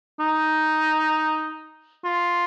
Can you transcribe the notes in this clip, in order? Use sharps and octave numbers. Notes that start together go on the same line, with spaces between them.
D#4
F4